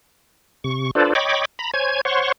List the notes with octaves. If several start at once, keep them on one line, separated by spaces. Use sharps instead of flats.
C3 C#6
D4 F4 A4 B4 C5 D5
C#5 D#5 G5 B5 C#6 D6
A#5 B5
C5 C#5 G#5 G#6
C5 C#5 F#5 C6 C#6